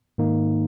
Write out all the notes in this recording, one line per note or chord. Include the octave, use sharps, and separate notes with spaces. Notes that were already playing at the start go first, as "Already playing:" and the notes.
G#2 D#3 A#3 D#4